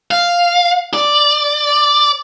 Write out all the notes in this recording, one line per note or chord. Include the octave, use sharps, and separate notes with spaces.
F5
D5